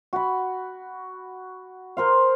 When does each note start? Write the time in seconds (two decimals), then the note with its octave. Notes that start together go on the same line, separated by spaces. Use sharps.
0.13 F#4 B5
1.97 A#4 C5 F5